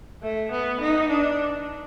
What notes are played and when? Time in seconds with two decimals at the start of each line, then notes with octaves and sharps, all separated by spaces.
0.23 A3
0.52 B3
0.80 D#4
1.09 D4